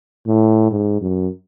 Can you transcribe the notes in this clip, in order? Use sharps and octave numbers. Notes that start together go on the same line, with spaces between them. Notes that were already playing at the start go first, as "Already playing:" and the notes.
A2
G#2
F#2